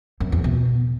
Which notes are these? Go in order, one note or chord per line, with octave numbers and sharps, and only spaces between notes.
F#2
E2
B2